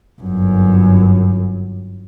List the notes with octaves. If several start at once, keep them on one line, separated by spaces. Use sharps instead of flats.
G1 F#2